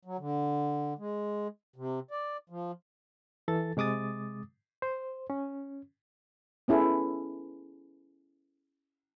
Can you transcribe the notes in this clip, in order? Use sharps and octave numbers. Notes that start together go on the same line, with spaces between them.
F#3
D3
G#3
C3
D5
F3
E3 A4 A6
C3 G#3 D6 D#6 A6
C5
C#4
B3 C#4 E4 G#4 A4 B4